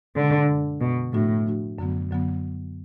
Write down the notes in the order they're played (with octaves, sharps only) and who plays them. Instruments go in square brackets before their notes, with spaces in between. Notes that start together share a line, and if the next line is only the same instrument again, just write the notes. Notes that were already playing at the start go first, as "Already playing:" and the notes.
[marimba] B2 G#3 D4 [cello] D3
[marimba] F#2 D3 G#3
[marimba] F#2 D3 G#3 [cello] B2
[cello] A2 [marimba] F3 A3 D4 F#4
[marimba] F3 A3 D4 F#4
F#2 D3 F#3 B3
F#2 D3 F#3 B3